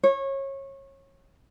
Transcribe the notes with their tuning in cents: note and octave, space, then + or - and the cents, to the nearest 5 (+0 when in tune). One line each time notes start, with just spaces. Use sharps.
C#5 -25